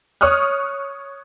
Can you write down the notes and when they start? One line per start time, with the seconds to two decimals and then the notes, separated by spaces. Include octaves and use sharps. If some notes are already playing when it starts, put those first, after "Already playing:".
0.21 C#5 C#6 D#6 F6 F#6